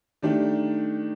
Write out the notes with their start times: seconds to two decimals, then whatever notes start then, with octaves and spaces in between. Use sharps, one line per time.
0.23 D#3 A3 D4 G4